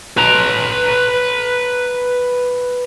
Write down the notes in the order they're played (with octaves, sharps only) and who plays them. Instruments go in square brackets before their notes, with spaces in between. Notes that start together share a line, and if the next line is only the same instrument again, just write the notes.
[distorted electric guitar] B4 A#5